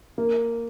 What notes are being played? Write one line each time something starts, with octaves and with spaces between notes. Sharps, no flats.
A#3